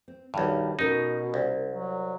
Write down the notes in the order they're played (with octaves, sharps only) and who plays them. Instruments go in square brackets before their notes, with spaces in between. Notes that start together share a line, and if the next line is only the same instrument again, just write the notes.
[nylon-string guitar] C4
[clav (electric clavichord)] B1 G2 [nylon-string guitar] D#3 G3
[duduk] B2 [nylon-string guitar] C#4 A4 A#4 [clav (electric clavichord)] D#4
[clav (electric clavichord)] C2
[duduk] F#3